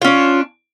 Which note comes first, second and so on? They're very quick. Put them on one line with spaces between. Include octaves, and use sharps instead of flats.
F4 C#4 D4